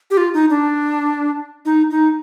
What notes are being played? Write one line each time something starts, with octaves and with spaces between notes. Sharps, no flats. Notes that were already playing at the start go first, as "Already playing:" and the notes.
G4
F4
D#4
D4
D#4
D#4